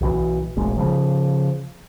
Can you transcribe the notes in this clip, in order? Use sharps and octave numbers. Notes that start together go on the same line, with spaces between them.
B1 B2 E3
E1 A#1 G#3
C#3 F3